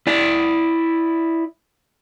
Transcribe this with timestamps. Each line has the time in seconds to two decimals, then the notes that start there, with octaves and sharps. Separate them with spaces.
0.07 E4 D5